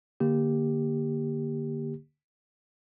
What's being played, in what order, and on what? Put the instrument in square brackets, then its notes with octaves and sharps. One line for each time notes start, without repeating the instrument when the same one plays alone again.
[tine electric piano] D3 A#3 G4